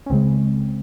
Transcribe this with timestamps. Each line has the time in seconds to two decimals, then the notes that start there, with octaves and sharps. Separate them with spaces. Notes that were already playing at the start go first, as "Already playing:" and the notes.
0.06 C#4
0.10 C#2 C#3 G#3 C4